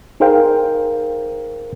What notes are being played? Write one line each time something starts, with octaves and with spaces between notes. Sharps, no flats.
D#4 G#4 A#4 C5 F5 G5